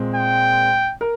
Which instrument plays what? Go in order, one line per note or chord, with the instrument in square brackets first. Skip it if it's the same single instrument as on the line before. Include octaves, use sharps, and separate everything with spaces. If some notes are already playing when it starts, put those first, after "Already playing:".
Already playing: [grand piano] A#2 G#3 C4
[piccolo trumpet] G5
[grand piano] A#4